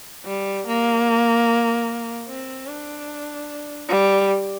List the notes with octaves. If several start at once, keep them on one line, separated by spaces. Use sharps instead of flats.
G3
A#3
C4
D4
G3